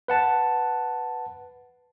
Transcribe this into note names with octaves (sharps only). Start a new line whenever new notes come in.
B4 F#5 A5